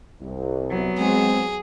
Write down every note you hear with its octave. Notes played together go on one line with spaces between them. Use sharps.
C2
F#3 B3
G#3 C4 G#4